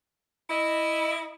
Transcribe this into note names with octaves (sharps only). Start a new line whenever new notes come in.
E4 D#5